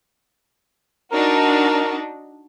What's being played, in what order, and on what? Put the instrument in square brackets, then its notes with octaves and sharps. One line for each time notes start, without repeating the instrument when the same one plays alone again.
[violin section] D4 D#4 F#4 [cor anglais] A#4